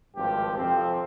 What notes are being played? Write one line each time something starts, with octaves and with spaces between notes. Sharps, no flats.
G#1 G2 F3 G4
F2 C3 F3 C4